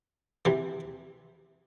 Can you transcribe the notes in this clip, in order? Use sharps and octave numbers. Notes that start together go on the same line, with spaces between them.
C3 E3